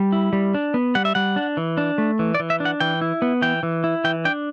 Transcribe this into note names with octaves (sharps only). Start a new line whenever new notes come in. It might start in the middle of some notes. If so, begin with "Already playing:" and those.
Already playing: G3
E4
G3
D4
B3
G3 F#5
E5
G3 F#5
D4
E3
D4
A3
E3
D5
E3
E5
D4
F#5
E3 G5
E4
B3
E3 G5
E3
E4
E3 G5
D4 G5